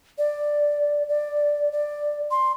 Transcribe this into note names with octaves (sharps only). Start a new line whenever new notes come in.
D5
D5
D5
C6